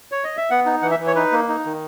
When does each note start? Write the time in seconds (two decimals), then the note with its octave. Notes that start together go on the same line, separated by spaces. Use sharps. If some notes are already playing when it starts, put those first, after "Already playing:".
0.12 C#5
0.24 D#5
0.37 E5
0.50 B3 F#5
0.66 D#4
0.82 E3 F#5
0.91 E5
0.99 E3
1.07 C#5
1.16 D#4 B4
1.32 A#3
1.49 D#4
1.65 D#3